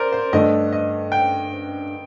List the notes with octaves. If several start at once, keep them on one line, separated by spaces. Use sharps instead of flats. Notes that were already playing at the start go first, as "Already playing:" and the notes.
Already playing: A#4 C5 D5
C5
G2 D3 A3 D4 D#5
D#5
G5